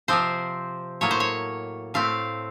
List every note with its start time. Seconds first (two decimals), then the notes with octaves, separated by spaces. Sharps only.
0.08 C3 F3 C4 C5
1.01 A2 F#3 A#3 C#5
1.11 C5
1.20 C#5
1.94 A2 A3 C4 F5